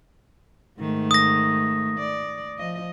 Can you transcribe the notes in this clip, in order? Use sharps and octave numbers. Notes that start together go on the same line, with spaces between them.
G#2 D#3 A3
D#6 A#6
D5
F3 D#5